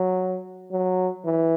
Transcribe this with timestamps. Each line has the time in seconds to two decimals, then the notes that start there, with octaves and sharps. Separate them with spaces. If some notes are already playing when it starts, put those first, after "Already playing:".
Already playing: F#3
0.71 F#3
1.25 E3